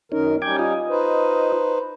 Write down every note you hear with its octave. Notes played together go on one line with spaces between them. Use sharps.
F#2 D#3 C#4 D#4 A#4
G3 C#4 D#4 G5 D6 G#6
F4 D#5
D#4 B4 C5